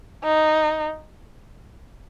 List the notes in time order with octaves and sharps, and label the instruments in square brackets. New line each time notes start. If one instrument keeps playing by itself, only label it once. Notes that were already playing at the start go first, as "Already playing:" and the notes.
[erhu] D#4